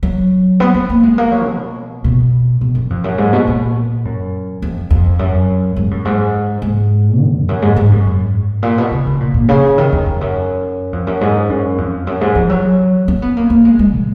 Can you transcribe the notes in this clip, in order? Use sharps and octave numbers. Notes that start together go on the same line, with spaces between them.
F#3
B3
B3
A#3
G#3
A#3
F#3
B2
B2
B2
F#2
F2
F#2
G#2
B2
A#2
F#2
F2
F2
F#2
G#2
F#2
G#2
G#2
D#3
F2
F#2
G#2
G#2
F#2
G#2
A#2
B2
C#3
C#3
A#2
A#2
C#3
D#3
F2
F2
F#2
F2
F#2
G#2
F#2
F2
F#2
G#2
F3
F#3
C#4
B3
A#3
A#3
G#3
G#3
A#2